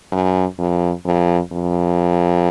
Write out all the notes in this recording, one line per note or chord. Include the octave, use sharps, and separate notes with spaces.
F#2
F2
F2
F2